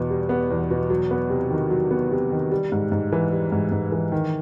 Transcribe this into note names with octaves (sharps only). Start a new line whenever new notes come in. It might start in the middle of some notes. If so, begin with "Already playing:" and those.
Already playing: E2 B2 B3
G3
B3
E2
B2
F#3
B3
C3
D#3
F#3
B3
C3
D#3
G3
G#2
G#2
E3
G3
G#2
G#2
E3
D#3